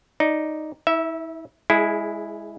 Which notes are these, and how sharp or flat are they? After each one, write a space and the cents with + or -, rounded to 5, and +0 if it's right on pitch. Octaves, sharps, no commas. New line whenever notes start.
D#4 +0 D5 +0
E4 -40 E5 -5
G#3 -10 E4 +0 G#4 +25